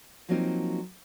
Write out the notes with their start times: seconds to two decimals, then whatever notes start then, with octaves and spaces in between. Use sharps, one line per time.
0.29 F3 F#3 A#3 C4 D#4 F4